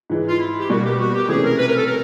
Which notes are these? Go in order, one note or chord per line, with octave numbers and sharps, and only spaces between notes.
G#2 E3 G#3
F4
E4
G4
B2 G3 A#3 F#4
G4
F#4
G4
C3 E3 A3 C#4 G#4
A#4
B4
A#4
A4
A#4